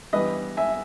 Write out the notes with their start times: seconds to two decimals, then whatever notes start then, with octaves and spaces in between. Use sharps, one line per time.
0.13 G2 E3 G3 B3 B4 D#5
0.57 E5 G#5